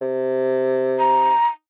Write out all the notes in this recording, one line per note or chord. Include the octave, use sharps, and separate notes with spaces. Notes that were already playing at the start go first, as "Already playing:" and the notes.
C3
A#5